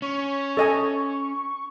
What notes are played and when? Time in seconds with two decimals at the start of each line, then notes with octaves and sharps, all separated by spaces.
0.02 C#4 C#6
0.57 A4 D#5 G#5